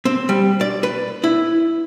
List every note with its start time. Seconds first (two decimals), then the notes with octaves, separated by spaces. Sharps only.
0.05 C4
0.29 G3
0.61 D5
0.83 B4
1.24 E4